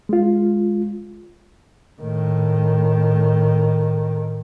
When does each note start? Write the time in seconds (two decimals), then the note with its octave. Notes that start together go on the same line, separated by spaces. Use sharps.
0.09 G#3 F4
2.02 A2 D#3